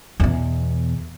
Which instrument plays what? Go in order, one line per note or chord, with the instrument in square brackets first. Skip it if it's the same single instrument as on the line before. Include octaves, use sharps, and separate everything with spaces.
[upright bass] E2 B2